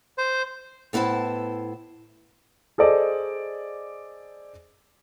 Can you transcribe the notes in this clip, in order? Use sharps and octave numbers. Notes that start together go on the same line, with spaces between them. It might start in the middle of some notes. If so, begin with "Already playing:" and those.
C5
A2 B3 E4 C5 A5
G#4 A4 C5 D5 D#5